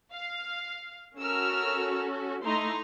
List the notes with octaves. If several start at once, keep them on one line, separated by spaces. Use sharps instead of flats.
F5
C#4 F#4 A4 A#4 E6 F6
A3 D#4 E4 A#5 C6